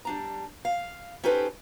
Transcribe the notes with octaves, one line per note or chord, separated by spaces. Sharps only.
G3 D4 A#5
F5
C#4 D#4 G4 A4 B4 C5